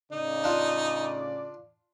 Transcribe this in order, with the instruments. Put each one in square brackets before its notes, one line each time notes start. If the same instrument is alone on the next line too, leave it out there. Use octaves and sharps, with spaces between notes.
[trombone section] A2 C#3 [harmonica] D#4 [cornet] D5
[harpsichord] D4 F4